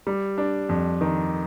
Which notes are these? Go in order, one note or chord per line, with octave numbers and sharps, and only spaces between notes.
G3
D4
F2
D#3